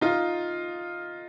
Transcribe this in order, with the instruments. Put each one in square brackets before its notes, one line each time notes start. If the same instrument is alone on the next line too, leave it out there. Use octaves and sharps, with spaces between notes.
[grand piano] D#4 F4